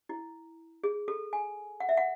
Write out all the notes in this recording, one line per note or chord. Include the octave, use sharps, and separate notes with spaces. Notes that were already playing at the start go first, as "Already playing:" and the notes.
E4
G#4
A4
G#5
F#5
E5
F#5